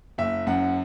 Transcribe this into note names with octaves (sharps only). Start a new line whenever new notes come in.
F#1 E5
F#2 F#5